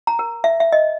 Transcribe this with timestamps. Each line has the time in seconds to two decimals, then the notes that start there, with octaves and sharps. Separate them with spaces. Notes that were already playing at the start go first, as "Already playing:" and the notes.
0.07 A#5
0.19 A#4
0.44 E5
0.60 E5
0.72 D#5